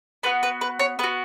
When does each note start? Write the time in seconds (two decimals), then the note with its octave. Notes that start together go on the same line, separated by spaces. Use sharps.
0.23 B3 F#4 B4
0.43 B4
0.61 B4
0.79 C#5
0.99 B3 B4
1.04 F#4